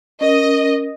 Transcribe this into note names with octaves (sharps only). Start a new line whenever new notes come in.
C#4 A#4 D#5